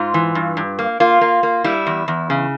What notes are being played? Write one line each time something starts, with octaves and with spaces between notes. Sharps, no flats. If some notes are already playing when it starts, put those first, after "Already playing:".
Already playing: G#2 F4
E3
G2
G2
A#3
A#3 F4
A#3
A#3
G3 E4
E2
E2
C#3